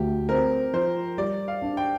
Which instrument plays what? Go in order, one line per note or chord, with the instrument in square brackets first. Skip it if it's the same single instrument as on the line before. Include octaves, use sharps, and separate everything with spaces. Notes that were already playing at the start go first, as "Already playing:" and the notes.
Already playing: [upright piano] D2 [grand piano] G4
[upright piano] C4 [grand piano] A#4
[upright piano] F3 [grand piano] C5
[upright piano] G3 [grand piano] D5
[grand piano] F5
[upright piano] D4
[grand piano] G5